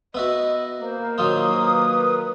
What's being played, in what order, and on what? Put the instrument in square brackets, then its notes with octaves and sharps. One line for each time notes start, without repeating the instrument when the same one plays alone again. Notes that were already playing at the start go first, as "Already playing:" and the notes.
[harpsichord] B3 E4 F#4 [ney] D#5
[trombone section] A#3 [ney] C5
[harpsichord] D#3 F#3 F4 [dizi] D#6
[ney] B4